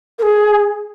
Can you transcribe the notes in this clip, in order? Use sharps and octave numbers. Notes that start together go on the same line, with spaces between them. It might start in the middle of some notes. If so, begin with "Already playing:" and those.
A#4
G#4